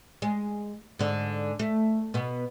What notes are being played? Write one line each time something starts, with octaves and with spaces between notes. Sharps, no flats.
G#3
G#2 D3
A3
B2 B3